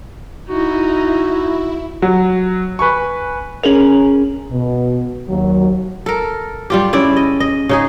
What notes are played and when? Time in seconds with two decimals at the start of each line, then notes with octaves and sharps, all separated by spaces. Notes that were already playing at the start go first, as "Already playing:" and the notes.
0.49 D#4 E4 F#4
2.02 F#3
2.79 B4 G#5 C#6
3.63 C#4 G#4 A#4 F7 F#7
4.52 B2
5.29 D#2 F#3
6.06 A4 A#4
6.70 G3 F4 G4
6.93 C#3 E4 D5
7.16 D#5
7.40 D#5
7.69 C#3 D#4 G#4